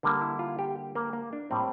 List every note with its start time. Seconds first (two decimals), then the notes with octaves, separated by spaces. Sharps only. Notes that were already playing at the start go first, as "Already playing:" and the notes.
0.03 D3 G3 A#3
0.21 E4
0.39 F4
0.59 G4
0.95 A#3
1.13 A#3
1.33 D4
1.51 A2 G3 A#3 C4